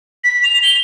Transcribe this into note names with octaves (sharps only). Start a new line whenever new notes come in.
B6
F7
G7